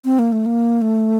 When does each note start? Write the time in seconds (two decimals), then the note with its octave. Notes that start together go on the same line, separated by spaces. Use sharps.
0.05 C4
0.19 A#3
0.32 A3
0.46 A#3
0.82 A3